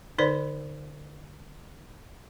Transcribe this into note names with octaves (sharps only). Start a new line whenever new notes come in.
D3 D#4 B4 C5 D5